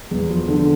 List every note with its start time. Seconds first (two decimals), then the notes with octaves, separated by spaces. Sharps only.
0.11 E2
0.29 F3
0.48 D3